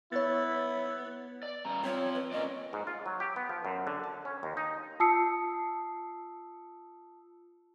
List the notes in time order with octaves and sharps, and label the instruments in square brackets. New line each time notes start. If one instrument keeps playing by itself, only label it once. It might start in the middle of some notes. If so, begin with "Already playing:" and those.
[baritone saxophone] B3 [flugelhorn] E4 [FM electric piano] C#5 A6
[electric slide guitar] D5
G2 C#3 A#5
[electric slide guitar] C4 F4 [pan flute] C#5
[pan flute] B4
[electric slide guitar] A#3 C#4 D5 [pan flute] D#5
[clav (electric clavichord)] G#2
F4
F#3
G4
B3
F3
F#2
D3
A5
C#4
D#2
D#4
[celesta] F4 A5 D#6 E6 C7 C#7